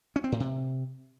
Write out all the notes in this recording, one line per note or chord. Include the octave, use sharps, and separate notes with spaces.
C#4
C4
A2
C3